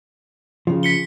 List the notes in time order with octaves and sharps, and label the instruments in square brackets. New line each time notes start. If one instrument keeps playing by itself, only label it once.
[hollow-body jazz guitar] C#3 F3
[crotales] B6 C#7 G7